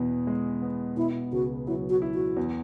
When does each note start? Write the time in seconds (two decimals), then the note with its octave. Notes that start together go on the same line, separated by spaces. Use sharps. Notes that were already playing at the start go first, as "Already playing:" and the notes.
Already playing: E2 B2
0.27 G#3
0.62 B3
0.97 B2 E4
1.32 C#2 F#4
1.67 F#3 E4
1.90 F#4
2.02 E4
2.14 F#4
2.36 E2